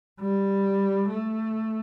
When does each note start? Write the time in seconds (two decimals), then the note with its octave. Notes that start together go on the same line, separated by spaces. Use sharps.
0.20 G3
1.09 A3